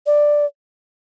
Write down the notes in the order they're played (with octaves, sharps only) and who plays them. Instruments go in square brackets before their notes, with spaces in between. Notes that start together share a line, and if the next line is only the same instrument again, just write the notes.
[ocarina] D5